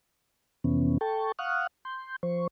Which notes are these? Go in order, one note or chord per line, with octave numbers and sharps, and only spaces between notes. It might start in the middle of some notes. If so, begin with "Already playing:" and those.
F2 C3 E3 B3 C#4
A4 G5 A5 C#6
F5 F#5 C#6 D#6 F6 F#6
C6 G6
F3 C5 C#6